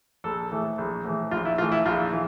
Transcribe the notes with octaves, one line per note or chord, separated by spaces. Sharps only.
A#1 A4
A2 E3
A#1
A2 E3
A#1 F4
E4
A2 E3 F4
E4
A#1 F4
E3